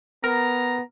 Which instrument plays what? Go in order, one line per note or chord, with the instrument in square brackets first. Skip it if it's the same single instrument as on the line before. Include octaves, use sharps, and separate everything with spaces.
[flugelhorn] B3 [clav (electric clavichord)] A#4 [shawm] A#5